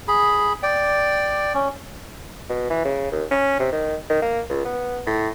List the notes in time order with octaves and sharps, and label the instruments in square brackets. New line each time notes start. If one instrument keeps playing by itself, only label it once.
[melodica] G#4 B5
D5 G5
C#4
[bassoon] B2
E3
C#3
D#2
C#4
C3
D#3
D#3
A#3
C#2
B3
A2